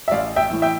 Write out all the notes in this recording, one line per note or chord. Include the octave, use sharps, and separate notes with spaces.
E5
A1 D5 F5
E5 G5
A2 E3
E5 G5